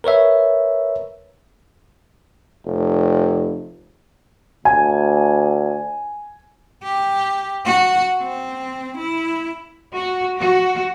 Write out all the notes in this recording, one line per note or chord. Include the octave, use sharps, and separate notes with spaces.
A#4 B4 C#5 E5
F1
D2 G#5
G4
F#4
C4
E4
F#4
F#4